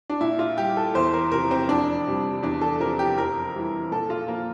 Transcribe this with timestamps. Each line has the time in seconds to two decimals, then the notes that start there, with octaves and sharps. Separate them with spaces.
0.10 D4
0.21 A#2 E4
0.39 F4
0.58 G3 G4
0.77 A4
0.95 E2 C5
1.14 A#4
1.31 C3 F3 A#4
1.51 C4
1.68 F2 D4
2.07 C3 G3
2.43 E2 D4
2.61 A4
2.80 C3 F3 A#4
2.99 G4
3.17 F2 A#4
3.55 E3 G3
3.91 A#2 A4
4.10 F4
4.28 F3 A#3